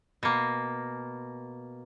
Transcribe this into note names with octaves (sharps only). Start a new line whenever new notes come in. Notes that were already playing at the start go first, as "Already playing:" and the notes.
B2 A#3